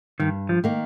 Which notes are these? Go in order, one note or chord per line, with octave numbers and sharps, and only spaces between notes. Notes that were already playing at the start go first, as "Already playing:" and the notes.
G2 D#3
F3
D#3 A#3